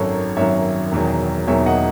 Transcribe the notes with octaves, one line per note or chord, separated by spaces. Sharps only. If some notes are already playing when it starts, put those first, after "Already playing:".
Already playing: G#1 F#2 D#3 F#3 A4 C#5
G#1 F#2 D#3 F#3 C#5 E5
E1 E2 D#3 F#3
E1 E2 D#3 F#3 C#5 E5
D#5 F#5